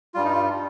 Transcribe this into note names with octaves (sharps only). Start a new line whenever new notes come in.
G2 G3 F4
D#4
F4